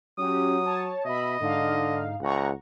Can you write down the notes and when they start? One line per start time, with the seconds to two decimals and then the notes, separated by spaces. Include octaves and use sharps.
0.19 F#3 C#4 F#4 G4 D#6
0.65 C#5 A5
1.05 B2 D#5 E5 B5
1.41 G#2 D3 D#4 F5
2.22 C#2 F#5 A#5 C#6